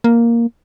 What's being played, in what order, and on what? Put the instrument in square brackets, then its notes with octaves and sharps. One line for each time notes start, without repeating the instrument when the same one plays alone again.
[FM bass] A#3